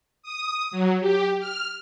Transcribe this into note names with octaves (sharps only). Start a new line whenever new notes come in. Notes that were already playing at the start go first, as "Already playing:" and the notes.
D#6
F#3
G4
F6